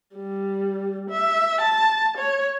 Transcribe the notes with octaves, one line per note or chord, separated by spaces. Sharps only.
G3
E5
A5
C#5